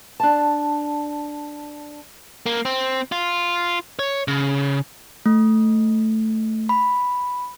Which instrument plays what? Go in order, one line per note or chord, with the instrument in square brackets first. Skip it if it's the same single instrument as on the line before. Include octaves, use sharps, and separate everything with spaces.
[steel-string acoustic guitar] D4 A5
[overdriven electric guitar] A#3
C4
F4
C#5
C#3
[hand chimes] A3
B5